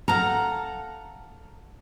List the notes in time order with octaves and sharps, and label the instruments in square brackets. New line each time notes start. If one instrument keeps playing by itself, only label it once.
[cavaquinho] A4 F5 F#5 [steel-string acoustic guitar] A#5